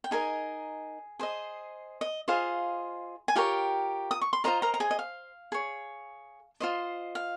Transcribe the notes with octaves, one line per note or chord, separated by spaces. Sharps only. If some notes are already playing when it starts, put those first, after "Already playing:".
G5
D#4 G#4 A#4 D#5 G#5
G#4 C5 D#5
D#5
F4 G#4 C5 D#5 F5
G#5
F4 G4 A#4 C#5 G5
D#6
C#6
C6
F4 A#4 C5 D#5 A#5
A#4 A#5
A#5
G#4 G#5
D#5
F5
G#4 C#5
F4 C5 D#5
F5